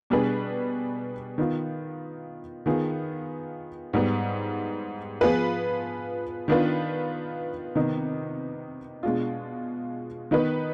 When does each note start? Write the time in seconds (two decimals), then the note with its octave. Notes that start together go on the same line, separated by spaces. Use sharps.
0.10 B2 G3 D4 G#4 B4
1.38 D#3 B3 F4
2.66 D#3 B3 F4 G#4
3.93 G#2 G3 B3
5.21 F3 B3 F4 G#4 B4
6.48 D#3 B3 D4 F4 B4
7.75 C3 D#3 B3 D#4
9.03 B2 G#3 D4 F4
10.31 D#3 B3 D#4 B4